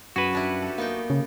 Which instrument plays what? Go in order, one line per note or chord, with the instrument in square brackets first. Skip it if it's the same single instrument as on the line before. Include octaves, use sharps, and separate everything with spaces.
[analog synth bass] F#2 [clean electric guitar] F#4 B4 [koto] G#4
[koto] G3 D4 E4
G4 A4
[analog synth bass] A#3 [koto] B3 D#4 G5
[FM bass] C#3